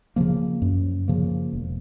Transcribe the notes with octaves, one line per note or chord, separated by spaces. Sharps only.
C#3 F3 A#3
F#2
C#3 F3 A#3
E1